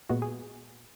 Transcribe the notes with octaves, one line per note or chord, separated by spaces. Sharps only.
A#2 G#3 B3 F#4
G#4